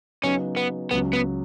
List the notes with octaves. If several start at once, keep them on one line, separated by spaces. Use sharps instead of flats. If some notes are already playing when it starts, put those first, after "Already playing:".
C#3 F#3 B3 C#4 D#4
B3
C#2 C#3 F#3 B3
B3